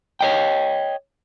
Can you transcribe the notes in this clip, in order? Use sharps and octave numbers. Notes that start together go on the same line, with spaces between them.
C#5 D#5 G5